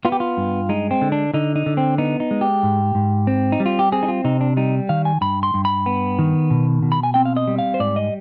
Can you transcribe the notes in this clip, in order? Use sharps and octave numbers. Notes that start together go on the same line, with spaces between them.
B3 F4
G4
F4
G2
G#3 D#4
C4
D3
D4
D3 D#4
D#4
D3
C4
B3 D#4
D#4
G#3
G4
G#2
G#2
C4
D#4
G3
F4
G4
C4 G#4
D#4
F4
C3 D#4
D4
G3 D#4
D#3 F5
G#5
G2 B5
C6
G2
B5
B3
D#3
B2
B2
B5
G#5
C4 G5
F5
D#5
G3
F5
C5
G#2 D5
D#5